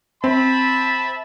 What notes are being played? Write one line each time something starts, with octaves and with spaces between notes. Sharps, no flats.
C4 E5 A5 B5